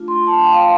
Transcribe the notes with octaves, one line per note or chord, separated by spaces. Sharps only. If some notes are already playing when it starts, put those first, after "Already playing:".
Already playing: A3 D4 F4
C6
A5
G5
F5
G5